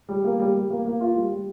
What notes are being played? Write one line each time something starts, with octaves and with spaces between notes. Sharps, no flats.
G3
A#3
G3
G3
A#3
A#3
F4
G3
G3